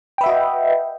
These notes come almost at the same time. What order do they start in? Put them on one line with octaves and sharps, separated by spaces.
G5 B4 E5 F#4 D#5